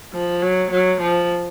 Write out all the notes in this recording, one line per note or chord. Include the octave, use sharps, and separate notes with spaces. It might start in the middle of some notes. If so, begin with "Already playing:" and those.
F3
F#3
F#3
F3